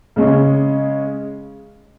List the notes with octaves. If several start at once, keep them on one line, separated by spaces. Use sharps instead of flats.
C#3 G#3 C#4